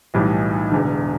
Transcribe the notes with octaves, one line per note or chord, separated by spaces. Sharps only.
B1 A2 E3 G3
E1 E2 D3